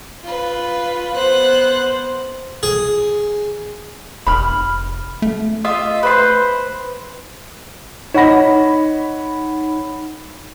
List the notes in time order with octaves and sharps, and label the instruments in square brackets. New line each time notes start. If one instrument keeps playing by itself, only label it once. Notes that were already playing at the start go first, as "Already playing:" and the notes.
[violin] F4 B4
[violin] B3 F#6 [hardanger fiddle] C5
[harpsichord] G#4
[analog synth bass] F1 [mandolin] B5 F6
[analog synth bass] A3
[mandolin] F4 D#5 E5
B4 C5 C6
[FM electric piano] D#4 B5 [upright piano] C#5 F#5 A#6